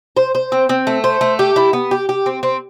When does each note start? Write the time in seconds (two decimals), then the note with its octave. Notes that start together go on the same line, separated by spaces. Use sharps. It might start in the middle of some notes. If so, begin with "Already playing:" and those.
0.17 C5
0.35 C5
0.52 C4
0.69 C4
0.87 A3
1.04 C5
1.21 A3
1.39 G4
1.56 E4
1.73 B3
1.91 G4
2.09 G4
2.26 C4
2.43 C4